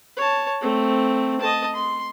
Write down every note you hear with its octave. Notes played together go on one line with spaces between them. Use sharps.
C#5 A5
A3 C4
D#5 A5
C6